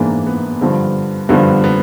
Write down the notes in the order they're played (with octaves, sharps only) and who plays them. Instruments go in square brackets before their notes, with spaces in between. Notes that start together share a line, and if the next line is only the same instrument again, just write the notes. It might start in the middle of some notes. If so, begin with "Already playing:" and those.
Already playing: [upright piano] G#2 E3 A#3 D4
B3
G2 D3 F3
G2 D3 F3 B3
B3